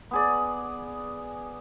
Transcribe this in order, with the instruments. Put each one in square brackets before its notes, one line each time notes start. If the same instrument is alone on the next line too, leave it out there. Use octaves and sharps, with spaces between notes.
[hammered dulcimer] B3 G#4 D5